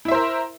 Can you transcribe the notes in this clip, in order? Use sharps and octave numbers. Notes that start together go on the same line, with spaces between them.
E4 A#4 C5 E5